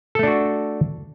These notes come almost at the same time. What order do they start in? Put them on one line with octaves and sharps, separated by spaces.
A4 A3 D4 F#4